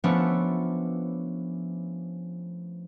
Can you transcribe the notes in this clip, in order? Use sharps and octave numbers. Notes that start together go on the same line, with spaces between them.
F3 A3 B3 C#4 D4